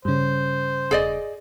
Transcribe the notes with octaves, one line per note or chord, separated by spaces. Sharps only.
G2 C#3 C5
E1 G#4 D5 D#5